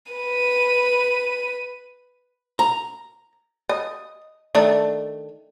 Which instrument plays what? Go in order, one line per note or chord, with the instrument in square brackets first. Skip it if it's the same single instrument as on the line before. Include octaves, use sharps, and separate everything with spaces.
[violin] B4 D#7
[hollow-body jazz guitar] A#5
[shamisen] D#5
D#3 A3 D4